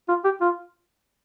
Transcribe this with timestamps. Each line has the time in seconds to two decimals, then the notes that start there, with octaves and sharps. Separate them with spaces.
0.08 F4
0.24 G4
0.41 F4